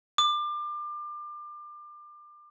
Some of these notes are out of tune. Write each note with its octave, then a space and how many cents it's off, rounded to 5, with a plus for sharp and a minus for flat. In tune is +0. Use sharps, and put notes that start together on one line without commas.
D6 +30